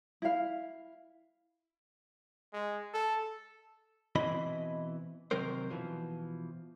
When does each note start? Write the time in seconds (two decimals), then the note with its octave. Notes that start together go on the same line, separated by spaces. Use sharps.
0.22 E4 F5
2.53 G#3
2.94 A4
4.15 B2 E3 C4 E4 D#5 B5
5.31 C3 D#3 F#3 C4 A#4 C5
5.70 B2 E3 F3